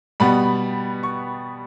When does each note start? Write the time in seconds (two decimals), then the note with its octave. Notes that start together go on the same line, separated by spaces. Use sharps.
0.20 B2 G3 B3 B5
1.03 C#6